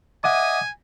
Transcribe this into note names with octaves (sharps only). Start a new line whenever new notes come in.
D#5 E5 F#5 G#5 D6